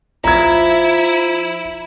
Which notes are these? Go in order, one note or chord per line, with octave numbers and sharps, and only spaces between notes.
F3 E4 A#5 G#6